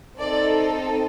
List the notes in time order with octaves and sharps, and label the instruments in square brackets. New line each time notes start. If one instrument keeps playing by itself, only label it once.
[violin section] C4 D#4 A4 D5